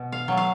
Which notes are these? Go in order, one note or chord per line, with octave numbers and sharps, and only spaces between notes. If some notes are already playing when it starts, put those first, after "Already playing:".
Already playing: B2
F5
F#3 A3
F5